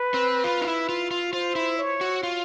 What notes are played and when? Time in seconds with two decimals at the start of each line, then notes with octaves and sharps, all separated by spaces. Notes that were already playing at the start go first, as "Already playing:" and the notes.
Already playing: B4
0.14 C4
0.44 F4
0.61 D#4
0.67 E4
0.89 F4
1.11 F4
1.33 F4 C5
1.56 E4
1.78 C#5
2.01 F#4
2.23 F4